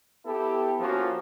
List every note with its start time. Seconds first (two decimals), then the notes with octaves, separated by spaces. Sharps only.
0.25 B3 E4 G4 A4
0.79 F3 A#3 C#4 F4 F#4